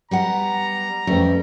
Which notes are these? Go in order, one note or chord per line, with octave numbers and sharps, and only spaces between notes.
G3 B3 F#5 A#5
F2 G3 A3 C#4 B4